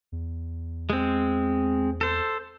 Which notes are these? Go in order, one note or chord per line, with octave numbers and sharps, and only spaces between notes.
E2
G#3 C4
A4 C5